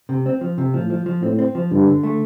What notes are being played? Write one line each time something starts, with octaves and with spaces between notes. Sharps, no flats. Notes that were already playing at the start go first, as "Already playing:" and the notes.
C3
C4
F3
C3
A2 F3
F3
F3
A2 C4
C4
F3
G2 D3
D3
A3